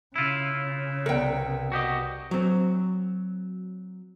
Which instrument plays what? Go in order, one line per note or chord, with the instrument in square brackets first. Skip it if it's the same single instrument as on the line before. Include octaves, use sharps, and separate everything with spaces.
[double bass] C#3 [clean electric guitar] E4 F4
[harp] C2 B3 C#7 [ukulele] A#4 G5
[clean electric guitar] F#4 G4 D#5
[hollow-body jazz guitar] F#3 C4